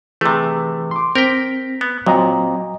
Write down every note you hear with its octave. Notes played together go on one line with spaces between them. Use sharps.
C3 E3 A3 G#4
C6 D6
C4 A#4 G5 G6 A#6 B6
B3
A#2 F#3 C4 D#5 A#5